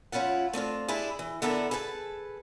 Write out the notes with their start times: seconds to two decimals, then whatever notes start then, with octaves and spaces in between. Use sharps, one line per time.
0.12 F3 C#4 E4 F4 F#5
0.53 A3 C4 D4 F4
0.88 D4 E4 G4 G#4
1.19 E3
1.42 D3 B3 D4 E4 A4 A#4
1.71 G#4 A4 B4 G5 A5